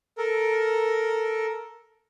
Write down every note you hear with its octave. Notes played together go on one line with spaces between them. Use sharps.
A4 A#4